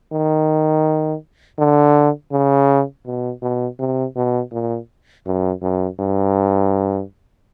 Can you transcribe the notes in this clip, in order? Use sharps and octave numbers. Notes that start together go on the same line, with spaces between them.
D#3
D3
C#3
B2
B2
C3
B2
A#2
F#2
F#2
G2